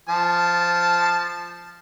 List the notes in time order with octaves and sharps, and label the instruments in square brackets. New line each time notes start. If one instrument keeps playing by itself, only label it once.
[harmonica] F3 A5